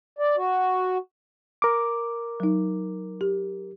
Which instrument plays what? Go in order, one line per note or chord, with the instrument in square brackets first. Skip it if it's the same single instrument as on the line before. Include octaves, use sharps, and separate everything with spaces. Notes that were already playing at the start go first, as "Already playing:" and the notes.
[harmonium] D5
F#4
[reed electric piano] A#4 D6
[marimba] F#3 D#4
G4